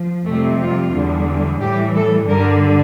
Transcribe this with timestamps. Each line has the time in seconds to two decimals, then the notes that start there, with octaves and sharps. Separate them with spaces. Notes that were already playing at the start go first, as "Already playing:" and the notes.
Already playing: F3
0.25 F2 C3 G3 A3
0.60 F4
0.94 E2 D3 G3
1.61 A2 E3 G3 G4
1.95 A4
2.29 G2 D3 G3 A#4